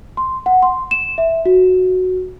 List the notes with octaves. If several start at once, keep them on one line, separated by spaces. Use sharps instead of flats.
C6
F#5
C6
E7
E5
F#4